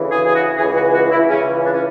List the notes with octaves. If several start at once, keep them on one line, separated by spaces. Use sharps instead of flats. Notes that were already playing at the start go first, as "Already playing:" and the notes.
Already playing: D2 C#3 E3
G#4
G#4
F#4
C#2 C#3 E3 G#4
F#4
F#4
E4
C#2 C#3 E3 C#4
D4
C#4